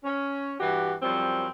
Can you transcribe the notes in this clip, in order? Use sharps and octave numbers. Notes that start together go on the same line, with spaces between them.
C#4
G2 E3 F#4 G4
F#2 F3 G3 C4